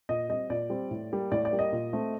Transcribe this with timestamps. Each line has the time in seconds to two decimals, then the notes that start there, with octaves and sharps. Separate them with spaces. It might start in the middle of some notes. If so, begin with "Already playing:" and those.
0.09 A#2 D#5
0.29 G3 C4 D#5
0.50 A#2 D5
0.70 G3 C4
0.91 A2
1.11 G3 A#3
1.32 A2 D5
1.45 D5
1.51 G3 A#3
1.59 D#5
1.72 A#2
1.93 A3 C4